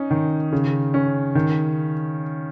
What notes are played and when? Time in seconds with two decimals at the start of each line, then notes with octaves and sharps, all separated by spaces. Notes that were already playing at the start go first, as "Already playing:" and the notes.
Already playing: C#4 D#4
0.11 D#3
0.53 C#3
0.94 C#4
1.35 D#3